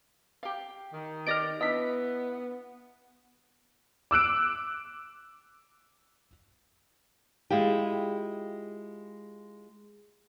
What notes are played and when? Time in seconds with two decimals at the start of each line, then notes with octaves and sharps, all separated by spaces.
0.43 G4 F5
0.93 D#3
1.27 G4 D5 D#5 F6 A#6 D7
1.61 B3 D4 E4 D#5 B6
4.11 D6 E6 F#6 D7
7.50 G#3 E4 F4 G4